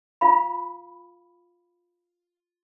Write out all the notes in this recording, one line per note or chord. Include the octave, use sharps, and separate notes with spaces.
F4 F5 B5